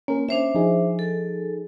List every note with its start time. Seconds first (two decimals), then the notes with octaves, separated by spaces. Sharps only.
0.08 A#3 C#4 A#4
0.29 C#4 D4 C5 E5
0.55 F3 D#4 G#4
0.99 A4